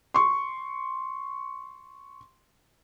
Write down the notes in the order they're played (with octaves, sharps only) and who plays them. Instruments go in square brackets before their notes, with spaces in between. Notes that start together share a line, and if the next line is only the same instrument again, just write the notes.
[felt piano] C6 C#6